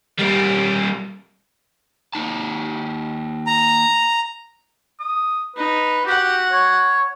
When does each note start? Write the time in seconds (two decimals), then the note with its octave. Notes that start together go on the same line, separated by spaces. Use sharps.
0.19 G3 A#3
2.13 A#3 D#4 A5
3.47 A#5
5.00 D#6
5.56 D#4 B4
6.06 F#4 G4 F#5
6.52 C#5